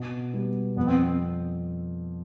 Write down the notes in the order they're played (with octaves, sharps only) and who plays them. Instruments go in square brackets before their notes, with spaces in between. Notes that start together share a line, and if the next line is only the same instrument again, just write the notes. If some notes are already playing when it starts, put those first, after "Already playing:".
Already playing: [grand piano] B2
G3 B3
[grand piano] F2 [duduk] B3
[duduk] C4